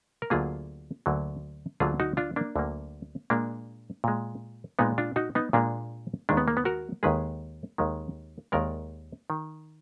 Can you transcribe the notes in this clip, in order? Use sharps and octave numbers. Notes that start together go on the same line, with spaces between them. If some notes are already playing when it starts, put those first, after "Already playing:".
A#4
D2 D3 F#3 A#3 F4 G#4
D2 D3 F#3 A#3
D2 D3 F#3 A#3 F4 G#4
D#4 F#4
D4 F4
A#3 D4
D2 D3 F#3 A#3
A#2 G#3 A#3 D4
A#2 G#3
A#2 G#3 B3 D#4
D4 F4
D#4 F#4
B3 D#4
A#2 G#3 A#3 D4
D#2 D#3 G#3 D4
B3
A#3
B3
F#4 A#4
D#2 D#3 G#3 G#4 B4
D#2 D#3 G#3
D#2 D#3 G#3 A#4 D5
D#3